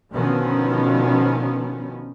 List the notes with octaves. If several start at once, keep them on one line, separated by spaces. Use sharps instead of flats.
B2 D3 D#3 F3 B3 C#4